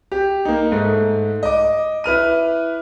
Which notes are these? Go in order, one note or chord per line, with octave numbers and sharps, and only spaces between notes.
G4
A#3 D#4
G#2 A3
D#5 D6
E4 B4 F6 D#7